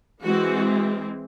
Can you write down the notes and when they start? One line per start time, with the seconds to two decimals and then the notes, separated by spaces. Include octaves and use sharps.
0.23 E3 G#3 C4 F#4